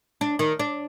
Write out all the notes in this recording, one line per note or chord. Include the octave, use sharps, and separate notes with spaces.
D4
D#3
D4